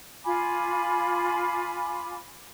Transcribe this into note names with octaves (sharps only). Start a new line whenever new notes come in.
F4 G#5 B5 D6